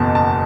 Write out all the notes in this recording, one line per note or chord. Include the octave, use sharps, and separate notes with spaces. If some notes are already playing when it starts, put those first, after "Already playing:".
Already playing: F#1 E2 B2 A5
A5